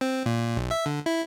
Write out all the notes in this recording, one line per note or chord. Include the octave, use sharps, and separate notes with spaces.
C4
A#2
B1
E5
D3
E4